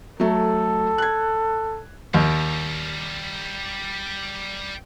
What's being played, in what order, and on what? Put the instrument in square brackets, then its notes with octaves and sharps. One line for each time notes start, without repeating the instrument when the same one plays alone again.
[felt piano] F#3 A3 [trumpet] A4
[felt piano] F#6 G#6
[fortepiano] D#2 [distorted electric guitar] G3 A#4